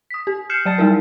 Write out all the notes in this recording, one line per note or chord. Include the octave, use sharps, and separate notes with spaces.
D#6 B6
G4
F6 G6 C7 C#7 E7
F#3 D5 A5 A6
G3 D#4 E4 A#4